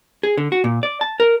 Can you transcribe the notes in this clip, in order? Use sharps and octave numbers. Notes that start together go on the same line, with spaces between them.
G#4
D3
F#4
A#2
D5
A5
A#4